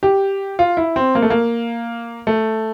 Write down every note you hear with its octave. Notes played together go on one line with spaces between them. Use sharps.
G4
F4
E4
C4
A#3
A3
A#3
A3